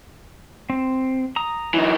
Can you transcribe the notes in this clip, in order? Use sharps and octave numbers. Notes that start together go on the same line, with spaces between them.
C4
A#5 D#6
E3 F#3 D#4